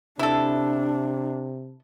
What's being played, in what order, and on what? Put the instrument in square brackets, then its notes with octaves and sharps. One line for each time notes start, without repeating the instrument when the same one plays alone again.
[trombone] C3 [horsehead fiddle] D4 [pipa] E4 A4